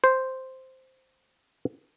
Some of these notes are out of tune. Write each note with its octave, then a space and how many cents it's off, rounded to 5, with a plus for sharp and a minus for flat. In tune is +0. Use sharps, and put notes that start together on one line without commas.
C5 +0